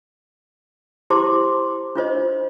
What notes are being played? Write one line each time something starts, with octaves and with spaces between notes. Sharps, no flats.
E4 G4 C5 A5 C6 D6
D4 F4 C5 D#5